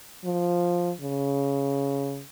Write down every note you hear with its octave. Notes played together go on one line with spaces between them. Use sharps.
F3
C#3